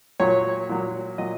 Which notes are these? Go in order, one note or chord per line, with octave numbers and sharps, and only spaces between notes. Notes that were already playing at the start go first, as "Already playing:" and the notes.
A#2 F#3 C#5
A#2 F#3
A#2 F#3 D#5